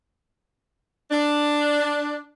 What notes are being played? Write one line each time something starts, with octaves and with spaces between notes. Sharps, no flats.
D4